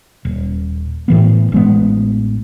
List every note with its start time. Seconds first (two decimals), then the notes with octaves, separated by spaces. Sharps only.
0.25 D#1
1.08 A2 E3 B3
1.52 A1 G#3 B3